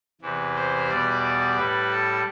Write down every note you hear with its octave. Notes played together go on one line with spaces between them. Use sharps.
E2 C3 E3
C5
E2 B2 G3 D5
A2 G3 B4
A4